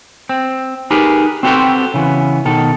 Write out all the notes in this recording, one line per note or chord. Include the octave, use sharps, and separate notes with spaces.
C4
D#4 G4 G#4 A#4 B4
C4 F#4 G4 A4 B4 C5
C#3 E3 B3
B2 D#3 A4